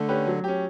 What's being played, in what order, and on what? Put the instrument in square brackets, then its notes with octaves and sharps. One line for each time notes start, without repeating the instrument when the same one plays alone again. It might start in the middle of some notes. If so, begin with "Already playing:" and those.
Already playing: [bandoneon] D3 [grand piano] A3
[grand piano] C#4 G4 B4
F#3
C#4 G4